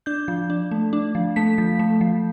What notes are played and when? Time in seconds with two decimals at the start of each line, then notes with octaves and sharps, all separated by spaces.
0.06 D4 G6
0.28 F3
0.50 D4
0.71 A3
0.93 D4
1.15 F3
1.36 A3 B6
1.58 F3
1.79 A3
2.01 F3